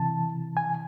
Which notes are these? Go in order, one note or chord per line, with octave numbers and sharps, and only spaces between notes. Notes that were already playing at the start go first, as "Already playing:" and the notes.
Already playing: C3 E3 A5
G#5